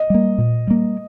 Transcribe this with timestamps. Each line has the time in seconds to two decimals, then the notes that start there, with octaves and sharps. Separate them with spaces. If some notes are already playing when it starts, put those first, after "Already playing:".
Already playing: D#5
0.10 G3 A#3
0.38 A#2
0.67 G3 A#3